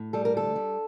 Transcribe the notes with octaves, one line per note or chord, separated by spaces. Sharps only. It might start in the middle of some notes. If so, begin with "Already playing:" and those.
Already playing: A2
G3 A4
A#4
D2 A4
G3